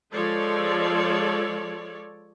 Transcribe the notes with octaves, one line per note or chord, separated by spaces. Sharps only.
F3 G#3 A4 C#5 D5